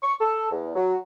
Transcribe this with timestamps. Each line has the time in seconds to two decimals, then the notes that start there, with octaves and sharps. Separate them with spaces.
0.03 C#6
0.21 A4
0.52 E2
0.76 F#3